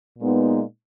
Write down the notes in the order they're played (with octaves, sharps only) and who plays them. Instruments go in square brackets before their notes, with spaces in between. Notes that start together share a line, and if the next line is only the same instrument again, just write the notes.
[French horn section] A#2 G#3 B3 D#4